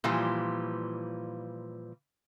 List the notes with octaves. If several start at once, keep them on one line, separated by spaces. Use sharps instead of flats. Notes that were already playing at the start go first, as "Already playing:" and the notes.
A#2 E3 F3 G3